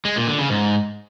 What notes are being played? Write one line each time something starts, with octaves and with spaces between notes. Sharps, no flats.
G#3
A#2
D3
C#3
G#2